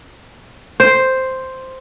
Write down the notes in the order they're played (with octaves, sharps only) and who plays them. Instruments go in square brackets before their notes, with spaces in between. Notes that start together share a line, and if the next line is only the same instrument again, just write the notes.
[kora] C5